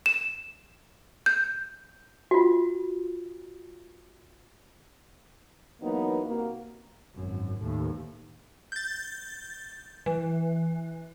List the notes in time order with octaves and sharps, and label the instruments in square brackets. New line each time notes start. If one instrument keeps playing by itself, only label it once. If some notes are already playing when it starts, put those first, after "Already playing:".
[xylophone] E7
G6
[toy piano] F4 F#4
[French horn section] E3 F#3 A#3 B3 D#4
C3 A#3 F#4
[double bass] G#1 F#2
D#2 A2
[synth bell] G6 A6
E3